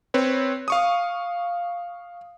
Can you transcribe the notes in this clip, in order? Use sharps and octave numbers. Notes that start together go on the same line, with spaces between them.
C4 B4 C#5
F5 C#6 D#6